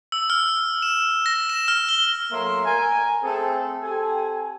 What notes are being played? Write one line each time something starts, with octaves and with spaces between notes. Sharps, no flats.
E6
F6
E7
A#6
E7
F6
G7
F#3 A3 A#3 A#4 E5 C6
A#4 G#5
A3 C4 G#4 A4
C4 G4 A4 G#5